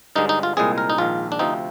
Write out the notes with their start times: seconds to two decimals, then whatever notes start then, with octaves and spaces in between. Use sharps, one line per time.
0.16 G2 D3 G#3 D#4
0.29 D#4
0.43 F4
0.57 C2 A#2 G#3 C4 G#4
0.78 A#4
0.90 D#4
0.98 A#1 G#2 D#3 F4
1.32 D4
1.39 D2 C3 F3 C4 D#4